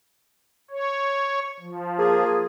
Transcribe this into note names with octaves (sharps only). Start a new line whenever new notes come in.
C#5
F3
A#3 F4 G#4